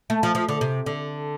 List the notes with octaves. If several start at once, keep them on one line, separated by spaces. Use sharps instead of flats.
A3
F3
F3
D3
C3
D3